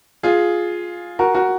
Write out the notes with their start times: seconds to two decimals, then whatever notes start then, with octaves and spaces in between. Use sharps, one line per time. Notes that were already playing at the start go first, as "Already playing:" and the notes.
0.23 F4 G#4
1.19 F#4 A#4
1.35 F#4 A#4